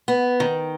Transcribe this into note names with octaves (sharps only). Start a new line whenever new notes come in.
B3
D#3